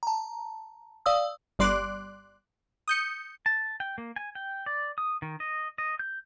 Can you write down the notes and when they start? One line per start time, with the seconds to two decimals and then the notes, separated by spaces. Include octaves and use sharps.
0.03 A5 A#5
1.06 D5 F5 D#6 E6
1.59 G1 G3 D5 C6 D6 F#6
2.88 D#6 G6 C#7
3.46 A5
3.80 G5
3.98 A#3
4.16 G#5
4.35 G5
4.66 D5
4.98 D#6
5.22 D#3
5.40 D#5
5.78 D#5
5.99 G6